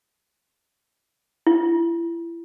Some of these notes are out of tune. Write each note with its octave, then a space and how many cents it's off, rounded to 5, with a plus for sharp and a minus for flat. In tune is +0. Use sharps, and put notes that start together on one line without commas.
E4 +35